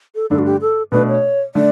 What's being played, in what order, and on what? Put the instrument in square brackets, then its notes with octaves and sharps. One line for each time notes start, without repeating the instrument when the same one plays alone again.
[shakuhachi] A4
[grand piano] G2 D3 A3 D4 [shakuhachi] A4
[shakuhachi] F#4
G4
A4
[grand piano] B2 A3 D4 [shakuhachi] B4
[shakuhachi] C#5
[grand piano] D3 A3 [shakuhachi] D5